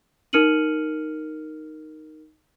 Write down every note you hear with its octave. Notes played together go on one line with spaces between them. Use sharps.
D#4 A#4 F6 C#7 D#7 F#7